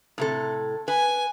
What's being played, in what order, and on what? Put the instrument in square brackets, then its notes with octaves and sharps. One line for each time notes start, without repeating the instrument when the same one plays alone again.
[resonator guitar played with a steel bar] A2 C3 A4
[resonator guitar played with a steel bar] B4 [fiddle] G#5